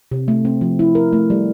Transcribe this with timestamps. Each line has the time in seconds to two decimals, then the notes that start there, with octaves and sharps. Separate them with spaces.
0.11 C3
0.28 A3
0.45 C4
0.61 F3
0.79 E4
0.95 A#4
1.13 A3
1.30 G3